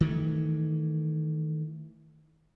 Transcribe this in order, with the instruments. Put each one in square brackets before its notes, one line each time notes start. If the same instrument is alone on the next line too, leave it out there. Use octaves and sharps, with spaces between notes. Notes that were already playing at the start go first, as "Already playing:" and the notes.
[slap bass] D#3 E3 A3